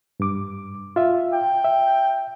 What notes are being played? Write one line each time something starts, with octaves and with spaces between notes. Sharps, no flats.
G2 D6
F4 E5
G5
E5